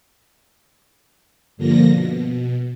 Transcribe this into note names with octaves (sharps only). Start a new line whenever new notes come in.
G2 D3 F3 A#3 A#6
B2